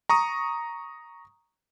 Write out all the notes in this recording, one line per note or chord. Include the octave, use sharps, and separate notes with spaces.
A#5 C#6 D#6